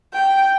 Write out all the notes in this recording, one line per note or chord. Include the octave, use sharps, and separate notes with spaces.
G5